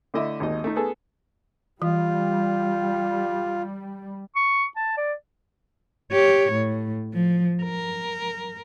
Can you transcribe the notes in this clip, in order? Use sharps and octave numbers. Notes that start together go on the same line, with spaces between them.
D3 A3 E4 D#5 E5 D6
G#1 D#2 D#4 D#5
A3 D#4
B3 G#4 A4
E3 G3 F4
C#6
A5
D5
G4 C#5
A2
F3
A#4